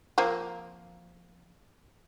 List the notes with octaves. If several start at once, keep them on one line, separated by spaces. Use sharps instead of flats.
F3 A#3 C4